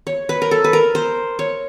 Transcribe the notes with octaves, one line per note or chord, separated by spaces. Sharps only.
C#5
B4
A#4
A4
B4
A#4
C5
C#5